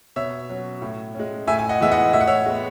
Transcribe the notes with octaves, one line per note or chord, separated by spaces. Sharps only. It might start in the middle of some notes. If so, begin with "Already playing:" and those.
B2 C#5 E5
F#3 C#4
A2
G#3 C#4
A2 E5 G#5
G#5
D#5 F#5
E3 G#3 B3 E5
D#5 F#5
A2 E5
F#5
C#5 E5
G#3 B3